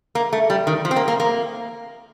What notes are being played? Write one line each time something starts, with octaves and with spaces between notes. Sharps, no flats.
A#3
A3
G3
D#3
F3
C4
A#3
A#3
A#3